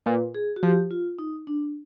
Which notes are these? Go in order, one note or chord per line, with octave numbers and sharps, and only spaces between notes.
A#2 B4
G#4
F#4
F3 G4
F4
D#4
D4